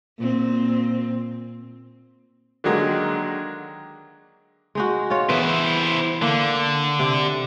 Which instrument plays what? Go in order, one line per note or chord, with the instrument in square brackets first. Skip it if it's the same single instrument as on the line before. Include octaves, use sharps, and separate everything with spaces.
[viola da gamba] A#2 C4
[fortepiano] D3 D#3 F#3 G#3 A#3
[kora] G#3 D#4 F#4
F4 C#5
[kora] E3 B3 [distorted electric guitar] E4 C5
[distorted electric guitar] D3 [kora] A#3
[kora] C3